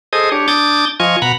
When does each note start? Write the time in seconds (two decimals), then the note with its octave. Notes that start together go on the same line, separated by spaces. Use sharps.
0.13 G#4 A4 C5 D#5 D#6
0.32 D4 G4 C#5
0.48 D4 D6 D#6 G6 A6
1.00 F3 F4 D#5 G#5 C#6
1.22 B2 F#5 A#5 B5